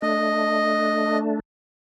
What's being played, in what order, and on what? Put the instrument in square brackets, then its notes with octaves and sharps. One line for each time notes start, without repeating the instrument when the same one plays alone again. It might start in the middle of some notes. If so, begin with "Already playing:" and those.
[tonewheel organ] A3 D4 [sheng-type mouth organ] D#5